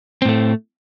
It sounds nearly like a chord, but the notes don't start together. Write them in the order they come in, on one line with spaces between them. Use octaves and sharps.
C4 A2 A3